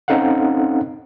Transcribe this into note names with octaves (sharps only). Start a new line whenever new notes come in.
C4 C#4 D#4 A4 F5 F#5